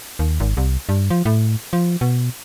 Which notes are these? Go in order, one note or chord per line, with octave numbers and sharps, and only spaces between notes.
D#2
G#1
C2
G2
F3
A2
F3
B2